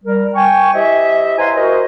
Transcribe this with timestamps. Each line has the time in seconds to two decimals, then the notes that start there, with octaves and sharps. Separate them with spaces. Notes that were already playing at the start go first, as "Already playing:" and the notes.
0.04 G3 A#4
0.34 G5 G#5 C#6
0.73 E4 G4 C5 D#5 E5
1.38 B4 C#5 F5 G#5 A#5 C6
1.54 F#4 A#4 C5 D#5